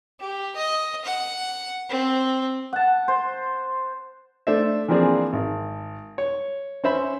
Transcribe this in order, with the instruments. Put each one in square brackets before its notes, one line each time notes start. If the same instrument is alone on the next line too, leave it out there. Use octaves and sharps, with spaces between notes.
[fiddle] G4
D#5
F#5
C4
[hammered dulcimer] F#5 A5
C5
[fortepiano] A3 D4 A4 C5 E5
E3 F3 A#3 C4 D4 G#4
G#1
C#5
C#4 C5 E5 B5